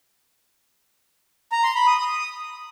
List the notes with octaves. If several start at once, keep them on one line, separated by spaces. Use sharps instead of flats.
A#5
C6
B5
D#6
D#6